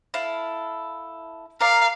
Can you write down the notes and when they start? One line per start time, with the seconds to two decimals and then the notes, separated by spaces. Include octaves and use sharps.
0.14 E4 A4 F5
1.61 A#4 D5 F5